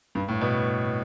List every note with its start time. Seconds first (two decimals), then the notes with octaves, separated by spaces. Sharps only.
0.15 G2
0.28 A2
0.41 B2